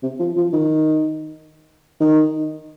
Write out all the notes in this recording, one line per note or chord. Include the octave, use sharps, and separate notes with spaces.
C3
F3
F3
D#3
D#3